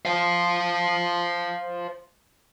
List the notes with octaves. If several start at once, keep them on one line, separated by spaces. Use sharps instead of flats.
C5 F5